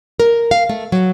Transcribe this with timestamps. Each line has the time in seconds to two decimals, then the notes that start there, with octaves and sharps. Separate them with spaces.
0.20 A#4
0.51 F5
0.69 A3
0.92 F#3